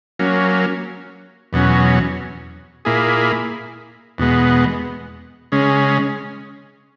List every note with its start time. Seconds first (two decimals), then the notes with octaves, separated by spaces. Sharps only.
0.19 F#3 A#3 C#4
1.53 E2 B2 F#3 C#4
2.85 A#2 A#3 E4 G#4
4.18 E2 B2 G#3 B3
5.52 C#3 G#3 C#4